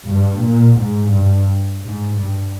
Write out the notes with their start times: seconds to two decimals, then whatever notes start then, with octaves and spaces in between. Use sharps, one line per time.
0.09 G2
0.43 A#2
0.79 G#2
1.13 G2
1.83 G#2
2.18 G2